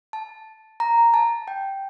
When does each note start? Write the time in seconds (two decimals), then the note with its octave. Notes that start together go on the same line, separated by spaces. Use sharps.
0.13 A5
0.80 A#5
1.14 A5
1.48 G5